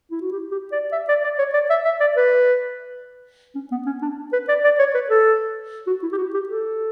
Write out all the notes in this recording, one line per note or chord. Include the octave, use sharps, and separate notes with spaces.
E4
F#4
G4
G4
D5
E5
D5
D5
C#5
D5
E5
E5
D5
B4
C#4
B3
C#4
D4
B4
D5
D5
C#5
B4
A4
F#4
E4
G4
F#4
G4
A4